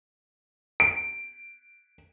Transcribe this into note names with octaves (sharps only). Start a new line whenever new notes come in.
D7